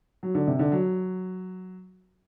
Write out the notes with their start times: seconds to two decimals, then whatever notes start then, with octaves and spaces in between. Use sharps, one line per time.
0.23 F#3
0.35 D3
0.47 C3
0.59 D3
0.72 F#3